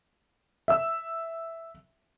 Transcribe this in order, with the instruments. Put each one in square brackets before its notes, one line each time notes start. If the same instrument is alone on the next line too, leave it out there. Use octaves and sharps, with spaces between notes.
[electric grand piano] E5 E6